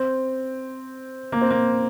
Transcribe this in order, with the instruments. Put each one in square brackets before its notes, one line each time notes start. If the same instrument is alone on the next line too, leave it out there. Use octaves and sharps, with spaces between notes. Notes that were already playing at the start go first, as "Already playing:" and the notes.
Already playing: [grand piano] C4
A#3
C4
A#3